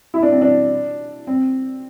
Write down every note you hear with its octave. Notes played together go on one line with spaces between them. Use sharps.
E4
D4
C4
D4
C4